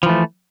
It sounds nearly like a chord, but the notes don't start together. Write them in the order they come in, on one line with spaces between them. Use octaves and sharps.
F3 E3 A3